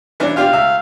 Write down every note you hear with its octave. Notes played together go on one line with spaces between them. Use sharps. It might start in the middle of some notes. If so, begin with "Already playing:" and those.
E3 C#4 D4
D4 F4 G4 F5
C#2 E5